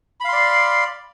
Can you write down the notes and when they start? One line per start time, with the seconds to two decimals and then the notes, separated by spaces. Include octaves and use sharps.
0.20 B5
0.24 F5
0.29 C6
0.33 D5